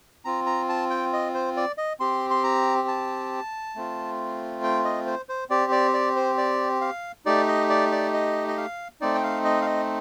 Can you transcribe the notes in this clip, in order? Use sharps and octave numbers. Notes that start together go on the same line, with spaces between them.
C4 F4 A#5
A#5
A5
G5
D#5
C5
D5
D#5
C4 G4 C6
C6
A#5
A5
A3 C4 F4
G5
D#5
C5
C5
C4 G4 D5
D5
D5
C5
D5
F5
A3 D#4 G4 D5
D#5
D5
D5
D#5
D#5
F5
A3 C4 D#4 D5
G5
F5
D#5
F5
D#5